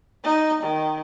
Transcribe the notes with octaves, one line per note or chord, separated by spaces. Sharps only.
D#4
D#3